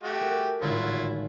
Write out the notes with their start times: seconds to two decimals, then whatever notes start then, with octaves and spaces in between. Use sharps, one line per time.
0.03 A3 F#4 G4
0.21 G#4 A#4
0.62 G#1 A2 D3 F#3 E4 F4